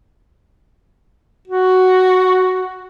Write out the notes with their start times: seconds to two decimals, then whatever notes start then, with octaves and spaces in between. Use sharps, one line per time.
1.48 F#4